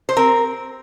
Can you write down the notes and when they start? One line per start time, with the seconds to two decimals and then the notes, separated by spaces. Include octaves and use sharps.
0.09 C5
0.17 C4 A#4